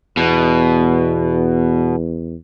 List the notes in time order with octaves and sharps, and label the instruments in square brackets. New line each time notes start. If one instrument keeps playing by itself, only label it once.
[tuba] E2 [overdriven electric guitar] B2